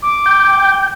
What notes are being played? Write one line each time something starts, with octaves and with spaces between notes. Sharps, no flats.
D6
G5